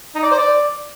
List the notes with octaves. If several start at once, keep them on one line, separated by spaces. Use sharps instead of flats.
D#4
D5
C5
D5